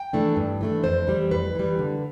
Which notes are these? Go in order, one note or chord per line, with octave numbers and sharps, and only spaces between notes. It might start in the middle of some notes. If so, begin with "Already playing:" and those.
Already playing: G5
E3 A3 D4
G2
E3 A3 D4
F2 C5
E3 G3
F2 B4
E3 G3
D3